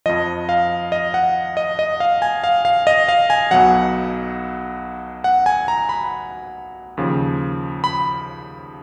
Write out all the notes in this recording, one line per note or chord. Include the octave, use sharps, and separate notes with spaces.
F2 F3 D#5
F5
D#5
F#5
D#5
D#5
F5
G#5
F5
F5
D#5
F5
G#5
B1 B2 F#3 F#5
F#5
G#5
A#5
B5
D#2 C#3 F3
B5